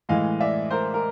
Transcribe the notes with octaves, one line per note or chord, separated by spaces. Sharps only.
A2 E3 G#3 D#5 F5
D5 E5
A#4 C5
A#4